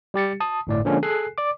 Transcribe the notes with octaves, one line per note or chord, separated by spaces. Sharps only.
G3 G4 A6 C#7
A5 D#6
G1 A2 D5
D3 F3 G#3 A#3 C#4 D4
G#4 A4 G#5 F#6 C7
D5 D6